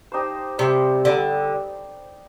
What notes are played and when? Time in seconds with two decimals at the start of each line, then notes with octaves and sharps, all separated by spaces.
0.12 D#4 G4 C5
0.58 C3 G3 C4 G4
1.05 D3 G3 C4 G4